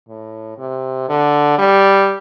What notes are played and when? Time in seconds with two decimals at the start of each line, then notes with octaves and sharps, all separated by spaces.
0.09 A2
0.58 C3
1.09 D3
1.59 G3